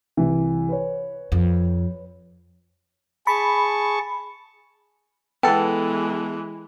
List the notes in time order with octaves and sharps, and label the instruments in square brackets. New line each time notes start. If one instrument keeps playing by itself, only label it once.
[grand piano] C2 E3
B4 C#5
[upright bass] F2
[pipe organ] G#4 A5 C#6 [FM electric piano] B5
[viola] E3 G#3 [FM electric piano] B3 A4 [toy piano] G5